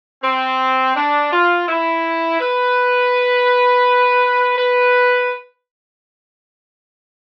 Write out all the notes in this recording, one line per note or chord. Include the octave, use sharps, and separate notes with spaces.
C4
D4
F4
E4
B4
B4